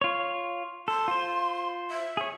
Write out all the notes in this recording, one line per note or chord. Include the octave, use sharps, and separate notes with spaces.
F4 C#5
A4 C6
F4 C5
E5
G#4 C#5